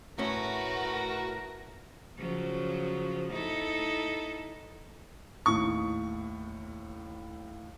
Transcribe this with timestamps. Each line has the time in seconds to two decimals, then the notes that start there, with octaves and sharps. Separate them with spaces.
0.19 A2 A3 C#4 F#4 A#4 B4
2.17 C#3 F3 F#3
3.32 D#4 E4 A4
5.46 D#2 A2 C#6